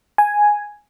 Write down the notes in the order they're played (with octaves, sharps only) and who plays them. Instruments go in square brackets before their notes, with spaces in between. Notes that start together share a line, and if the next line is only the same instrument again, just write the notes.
[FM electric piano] G#5